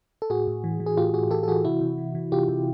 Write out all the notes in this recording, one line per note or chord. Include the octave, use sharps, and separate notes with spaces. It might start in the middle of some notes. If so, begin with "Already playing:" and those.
A4
A2 F#4 G#4
A2
E3
E3
G#4
A2 F4 G4
A2 F#4 G#4
E3 G4 A4
A4
E3 F#4 G#4
C3 E4 F#4
C3
E3
E3
C3 F4 G4
C3